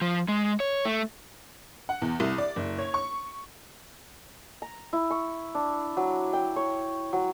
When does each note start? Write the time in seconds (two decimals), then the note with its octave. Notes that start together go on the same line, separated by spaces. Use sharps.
0.01 F3
0.28 G#3
0.60 C#5
0.85 A3
1.89 F#5
2.02 E2
2.20 C2
2.38 D5
2.56 F#1
2.78 C#5
2.94 C#6
4.62 A#5
4.93 E4
5.10 C#6
5.55 D4
5.97 F#3
6.33 G5
6.56 C#5
7.13 F#3